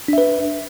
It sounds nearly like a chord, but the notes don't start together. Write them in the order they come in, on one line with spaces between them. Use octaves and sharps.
D4 E5 B4